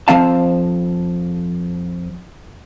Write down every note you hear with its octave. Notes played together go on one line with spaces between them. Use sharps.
F2 E3 F3 C4 F5 A5